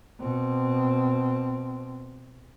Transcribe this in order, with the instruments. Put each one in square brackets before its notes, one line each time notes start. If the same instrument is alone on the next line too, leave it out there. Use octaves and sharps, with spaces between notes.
[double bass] B2 C4